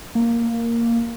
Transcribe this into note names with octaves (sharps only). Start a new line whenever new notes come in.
A#3